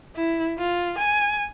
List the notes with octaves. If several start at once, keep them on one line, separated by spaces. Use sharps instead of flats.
E4
F4
G#5